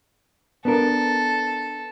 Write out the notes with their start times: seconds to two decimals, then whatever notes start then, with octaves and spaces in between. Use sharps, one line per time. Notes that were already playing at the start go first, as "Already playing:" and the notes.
0.65 B3 D4 A4 A#4